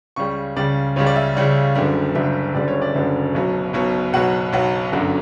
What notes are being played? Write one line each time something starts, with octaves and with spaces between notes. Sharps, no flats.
C#2 C#3 G3 C#6
C#2 C#3 G3 D5
C#2 C#3 G3 C#5
D5
E5
C#2 C#3 G3
F#1 F#2 D3 G3
F#1 F#2 D3 G3 E5
F#1 F#2 D3 G3 D5
C#5
D5
F#1 F#2 D3 G3 E5
B1 B2 F#3
B1 B2 F#3
B1 B2 F#3 F#5
B1 B2 F#3 F#5
G1 F#2 D3 F#3